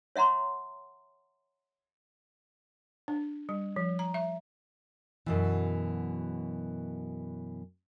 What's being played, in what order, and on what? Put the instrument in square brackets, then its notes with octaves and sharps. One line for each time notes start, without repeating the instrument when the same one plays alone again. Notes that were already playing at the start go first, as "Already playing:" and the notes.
[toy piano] C#5 E5 F#5 A#5 C6
[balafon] D4
G3
F3
A#5
E5
[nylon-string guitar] F#2 B2 E3